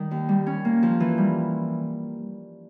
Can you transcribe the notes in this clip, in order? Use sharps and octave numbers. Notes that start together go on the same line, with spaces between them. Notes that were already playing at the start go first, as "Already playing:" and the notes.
Already playing: D#3 G3
D#2
G3
C#4
A#3
F3
E3
G3